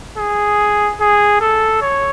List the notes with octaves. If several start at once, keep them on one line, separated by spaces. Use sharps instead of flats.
G#4
G#4
A4
C#5